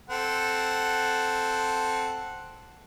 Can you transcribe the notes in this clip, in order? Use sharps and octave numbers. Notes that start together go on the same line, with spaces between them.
C4 A4 F#5